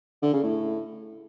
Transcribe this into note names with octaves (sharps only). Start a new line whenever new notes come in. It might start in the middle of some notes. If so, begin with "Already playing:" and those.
D3
C#3
A2